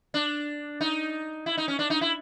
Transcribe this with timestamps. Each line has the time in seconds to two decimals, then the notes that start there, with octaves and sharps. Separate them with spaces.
0.14 D4
0.81 D#4
1.46 E4
1.58 D#4
1.68 C#4
1.79 D4
1.90 D#4
2.01 E4